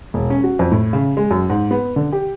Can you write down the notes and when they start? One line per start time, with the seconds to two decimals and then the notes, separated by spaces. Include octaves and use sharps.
0.14 E1
0.30 C#4
0.43 F#4
0.59 F2
0.72 A2
0.93 C#3
1.17 G#3
1.31 F#2
1.50 G#2
1.71 B3
1.96 D3
2.13 G4